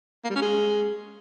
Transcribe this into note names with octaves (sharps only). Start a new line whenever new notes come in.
A#3
G3
C#4
G#3